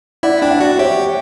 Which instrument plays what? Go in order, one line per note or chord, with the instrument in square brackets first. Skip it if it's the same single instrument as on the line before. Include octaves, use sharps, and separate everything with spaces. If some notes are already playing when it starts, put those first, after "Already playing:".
[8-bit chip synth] E4 [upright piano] D5 F#5
[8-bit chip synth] D4 [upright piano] G5
[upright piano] D5 F#5
[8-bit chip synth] F#4
[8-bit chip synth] G4 [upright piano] C#5 E5